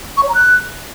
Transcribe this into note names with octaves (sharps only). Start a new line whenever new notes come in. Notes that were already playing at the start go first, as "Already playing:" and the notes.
C#6
C#5
A#5
F#6